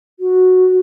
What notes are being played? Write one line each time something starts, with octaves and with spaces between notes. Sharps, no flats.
F#4